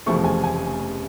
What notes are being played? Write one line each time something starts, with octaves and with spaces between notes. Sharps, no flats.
F1 E2 C#3 F3 A3 C#6
G#5
G#5